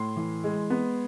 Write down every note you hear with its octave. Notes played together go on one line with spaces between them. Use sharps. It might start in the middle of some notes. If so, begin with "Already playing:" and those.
Already playing: A2 C6
E3
G#3
B3